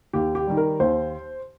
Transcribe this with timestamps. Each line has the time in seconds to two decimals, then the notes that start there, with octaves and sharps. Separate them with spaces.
0.13 D#2 G4
0.35 G4
0.46 D#3 G3
0.57 A#4
0.80 D#2 C5